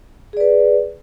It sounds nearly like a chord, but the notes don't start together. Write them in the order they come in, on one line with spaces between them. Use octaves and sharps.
G#4 D5 B4